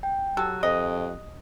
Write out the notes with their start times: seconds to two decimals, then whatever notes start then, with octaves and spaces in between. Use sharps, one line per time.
0.03 G5
0.37 F#3 G4 A4 F#6
0.63 F2 D#5